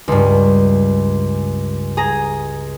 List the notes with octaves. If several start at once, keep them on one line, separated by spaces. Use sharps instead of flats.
C#2 G2
G#4 A#5